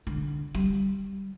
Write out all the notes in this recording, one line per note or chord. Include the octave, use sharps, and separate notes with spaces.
D3
G3